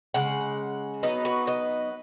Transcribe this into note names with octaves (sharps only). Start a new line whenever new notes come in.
C#3 G#3 F#5
F#3 B3 D#4 B4 D#5
F#4 B4
B4 D#5